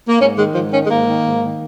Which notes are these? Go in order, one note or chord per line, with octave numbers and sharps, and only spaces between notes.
A#3
G#2 C#4
D#3 G#3
G#2 F3
D#3 C#4
G#3
G#2 A#3
D#3
G#2
D#3